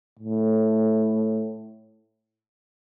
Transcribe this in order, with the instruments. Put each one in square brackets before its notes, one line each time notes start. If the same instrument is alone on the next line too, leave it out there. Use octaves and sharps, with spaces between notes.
[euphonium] A2